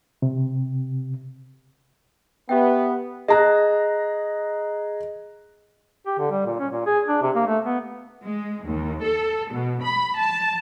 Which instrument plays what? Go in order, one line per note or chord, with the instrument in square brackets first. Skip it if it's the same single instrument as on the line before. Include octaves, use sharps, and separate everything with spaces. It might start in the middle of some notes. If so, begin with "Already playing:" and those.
[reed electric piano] C3
[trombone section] B3 [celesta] G4 E5 G5
[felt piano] G#4 A#5 F#6 [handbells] D#5
[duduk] G4
D3
G3
A#2
C#4
A#2
G#4
D4
C3
A#3
A3
B3
[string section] G#3
D#2
A4
B2
B5
A5